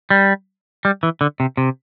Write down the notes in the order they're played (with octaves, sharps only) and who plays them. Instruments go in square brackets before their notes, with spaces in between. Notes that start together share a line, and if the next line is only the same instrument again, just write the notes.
[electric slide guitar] G3
G3
E3
D3
C3
C3